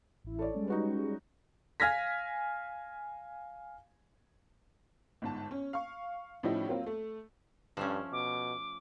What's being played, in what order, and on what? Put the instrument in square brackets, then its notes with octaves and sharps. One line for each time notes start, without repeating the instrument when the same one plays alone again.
[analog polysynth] A1 E4
[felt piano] A4 C#5 D5
[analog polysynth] G3 G#3 C#4
[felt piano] D#4 F#4 B4
[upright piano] F5 G#5 F6 G#6 A#6 B6
[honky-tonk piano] G1 G#2 A5
C#4
F5 C#6
A2 F3 G3 C#4 D#4 E4
F#3 A#3 C4 F4
A3
[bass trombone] G2 [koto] F3 A3 C#4
[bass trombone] B2 [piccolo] D6